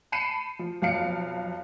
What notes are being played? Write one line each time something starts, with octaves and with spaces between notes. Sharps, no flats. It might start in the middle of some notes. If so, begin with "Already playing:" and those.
A5 B5 C7 C#7 D#7 E7
F3
B1 F2 F5 C#7 D7